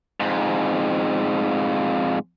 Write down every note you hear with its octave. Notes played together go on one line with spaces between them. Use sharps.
F2 G#2